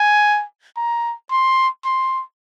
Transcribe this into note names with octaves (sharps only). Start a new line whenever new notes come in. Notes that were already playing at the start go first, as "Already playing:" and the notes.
Already playing: G#5
A#5
C6
C6